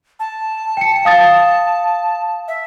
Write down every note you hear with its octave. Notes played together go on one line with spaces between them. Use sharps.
A5
G5 C#7
F5 D#6 A6
E5